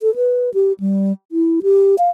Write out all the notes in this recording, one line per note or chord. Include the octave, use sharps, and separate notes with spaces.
A4
B4
G4
G3
E4
G4
F5